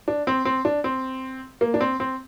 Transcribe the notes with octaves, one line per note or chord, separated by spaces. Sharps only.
D4
C4
C4
D4
C4
A#3
D4
C4
C4